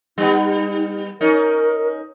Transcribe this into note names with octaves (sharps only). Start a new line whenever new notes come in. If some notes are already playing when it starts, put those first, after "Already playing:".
G3 B3 D#4
C#4 D#4 A#4